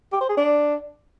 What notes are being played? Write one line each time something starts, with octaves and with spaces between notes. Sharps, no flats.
G4
C5
G#4
D4